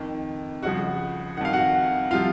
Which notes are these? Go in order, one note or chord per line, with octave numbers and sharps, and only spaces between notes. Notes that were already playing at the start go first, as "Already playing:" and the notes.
Already playing: F2 D#3
C#2 C#3 F3 F#4 F#5
F2 D#3 F5 F#5
F#4 F#5
C3 F3 F4 F5